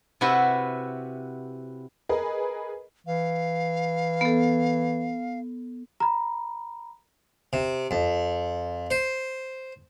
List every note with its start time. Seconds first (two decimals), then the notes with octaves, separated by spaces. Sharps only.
0.21 C3 E4 F#4 B4
2.09 G#4 A#4 B4 D#5
3.07 E3 F5
4.21 B3 A4
6.00 A#5 B5
7.53 C3
7.91 F2
8.91 C5